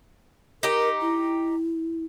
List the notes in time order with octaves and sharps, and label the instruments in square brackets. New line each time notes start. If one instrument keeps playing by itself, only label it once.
[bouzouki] D#4 G4 [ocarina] A#4
[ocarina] E4